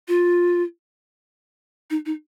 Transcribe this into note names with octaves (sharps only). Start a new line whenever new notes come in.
F4
D#4
D#4